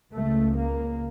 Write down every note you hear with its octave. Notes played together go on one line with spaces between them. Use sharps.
C#2 C#3 A3
A#3